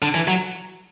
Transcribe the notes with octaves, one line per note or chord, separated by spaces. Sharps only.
D3
E3
F#3